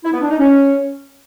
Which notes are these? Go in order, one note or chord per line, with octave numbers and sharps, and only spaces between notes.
E4
B3
D4
D#4
C#4